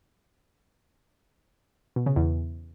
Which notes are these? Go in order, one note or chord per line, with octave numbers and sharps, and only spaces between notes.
B2
C#3
E2